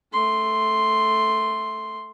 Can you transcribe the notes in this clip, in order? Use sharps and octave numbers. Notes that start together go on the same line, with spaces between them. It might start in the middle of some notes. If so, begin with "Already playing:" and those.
A3 C6